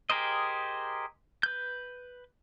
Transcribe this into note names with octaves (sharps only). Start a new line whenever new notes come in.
G4 G#4 A#4 C5 D#5
B4 G6